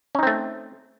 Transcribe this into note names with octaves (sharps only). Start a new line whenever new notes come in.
A3 C4 C#4 D#4